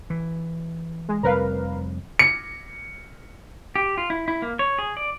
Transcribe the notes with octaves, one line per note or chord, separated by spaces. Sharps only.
E3
G#3
F1 F2 G3 A#4 B4 F5
C#7
G4
F4
E4
E4
A#3
C#5
G#4
D5